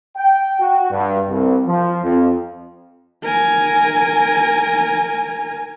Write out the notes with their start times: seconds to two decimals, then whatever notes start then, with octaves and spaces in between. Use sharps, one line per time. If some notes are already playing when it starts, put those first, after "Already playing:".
0.17 G5
0.60 F#4
0.91 G2
1.29 C2
1.67 F3
2.04 F2
3.24 A#4 G#5